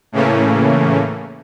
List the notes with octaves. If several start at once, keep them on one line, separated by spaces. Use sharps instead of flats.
A2 C#3 E3 A3 A#3 C#4